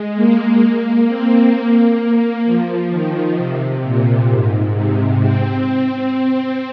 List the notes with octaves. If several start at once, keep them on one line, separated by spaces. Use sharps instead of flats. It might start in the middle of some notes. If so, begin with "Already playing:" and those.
Already playing: G#3
A#3
A#3
C4
A#3
F3
D#3
C3
A#2
G#2
C3
C4